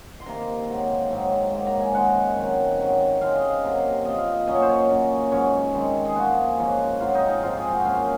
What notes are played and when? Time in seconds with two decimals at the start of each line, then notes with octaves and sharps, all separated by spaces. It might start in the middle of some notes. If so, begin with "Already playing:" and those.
0.20 C6
0.26 C3 D#3 A#3 A#5
0.68 G#2 F#3 C4
1.10 G#2 F#3 C4
1.52 G#2 F#3 A#3
1.66 A#5
1.80 G#5
1.94 F#2 D#3 G#3 F#5
2.37 D#3 F#3 C4
2.79 G#2 F#3 C4
3.21 C#3 G#3 C4 F5
3.35 D#5
3.49 F5
3.63 C3 F#3 A#3
4.05 A#2 F3 C4 D#5
4.18 F5
4.31 D#5
4.47 A#2 F#3 C#4 D#5
4.55 C#5
4.62 C5
4.69 C#5
4.89 A#2 F#3 C#4
5.32 G#2 F#3 C#4 C#5
5.74 D#3 G#3 C4
6.05 G#4
6.16 A#2 F3 A#3 F#4
6.58 G#2 F3 A#3 C#4
7.00 G#2 F#3 C4 F4
7.14 D#4
7.28 D#4
7.43 G#2 F3 C4 F4
7.57 G#4
7.71 F#4
7.84 F#2 F3 A#3 C#4 F5